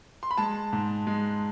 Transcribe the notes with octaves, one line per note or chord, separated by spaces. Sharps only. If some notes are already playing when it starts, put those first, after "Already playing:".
C6
B5
G#3 A5
G#2
G#3